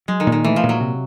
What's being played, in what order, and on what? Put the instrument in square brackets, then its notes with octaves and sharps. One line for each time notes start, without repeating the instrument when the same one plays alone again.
[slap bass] F#3 [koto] G#3
[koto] D#3
[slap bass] A#2
[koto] D#3
[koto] E3 [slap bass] A3
[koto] F3
[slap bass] A#2
[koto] F#3
[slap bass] C3